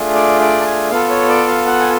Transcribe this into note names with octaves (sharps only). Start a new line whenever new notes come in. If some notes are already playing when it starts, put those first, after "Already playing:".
Already playing: A3 D4 F4 G#4
D5
D5
A5
G#5
B3 F4 A4 F5
C#5
D5
F5
F#5
G#5